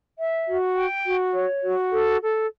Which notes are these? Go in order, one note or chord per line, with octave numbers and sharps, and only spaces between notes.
E5
F#4
G5
F#4
C#5
F#4
A4
A4